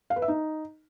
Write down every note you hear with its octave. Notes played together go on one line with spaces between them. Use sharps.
F5
B4
E5
D#4